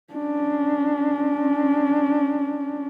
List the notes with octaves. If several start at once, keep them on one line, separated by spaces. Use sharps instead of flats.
C#4 D4